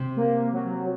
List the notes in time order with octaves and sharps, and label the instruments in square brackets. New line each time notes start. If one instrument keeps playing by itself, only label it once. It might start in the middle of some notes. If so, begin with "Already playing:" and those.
Already playing: [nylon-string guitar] C3
[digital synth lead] A#3
F#3